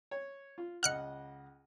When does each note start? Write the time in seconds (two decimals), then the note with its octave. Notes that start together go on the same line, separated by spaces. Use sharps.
0.11 C#5
0.58 F4
0.83 C#2 D#5 F#5 F6 F#6 C#7